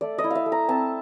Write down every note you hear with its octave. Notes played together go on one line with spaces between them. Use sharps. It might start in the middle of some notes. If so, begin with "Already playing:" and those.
A3 D5
D#5
E4
E5 F5
A3
A#5
C4 A5